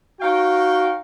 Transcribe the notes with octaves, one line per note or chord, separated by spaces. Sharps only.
D#4 F#4 C#5 F5 G5